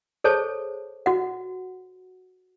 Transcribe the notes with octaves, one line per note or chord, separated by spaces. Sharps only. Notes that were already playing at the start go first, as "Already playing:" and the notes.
G#4 A4 C5 C#5 A5
F#4 F#5